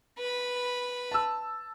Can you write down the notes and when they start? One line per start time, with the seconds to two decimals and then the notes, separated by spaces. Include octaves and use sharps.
0.18 B4 B5
1.11 A5 E6